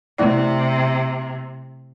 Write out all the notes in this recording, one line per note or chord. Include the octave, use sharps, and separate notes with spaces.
C3 A3 E4 D5